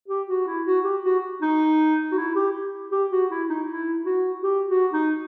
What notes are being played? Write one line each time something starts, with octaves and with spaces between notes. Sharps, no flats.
G4
F#4
E4
F#4
G4
F#4
D#4
F#4
E4
G4
G4
F#4
E4
D#4
E4
F#4
G4
F#4
D#4